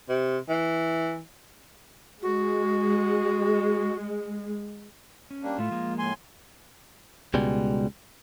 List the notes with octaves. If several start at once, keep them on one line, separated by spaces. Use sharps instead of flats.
C3
E3
G#3 F#4
C#4
G3 A#3 D4
A2 A3 F4
F3 G#3 A#3
A2 G#5 C6
C#2 B2 G3 G#3